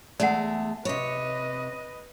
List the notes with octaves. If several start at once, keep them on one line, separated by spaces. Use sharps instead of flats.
E2 G#3 A3 D5 F#5
C3 B4 C#5 D#5